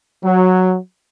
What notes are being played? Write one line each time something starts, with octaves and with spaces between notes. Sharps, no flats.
F#3